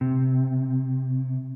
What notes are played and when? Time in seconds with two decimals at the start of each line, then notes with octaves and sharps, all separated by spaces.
0.01 C3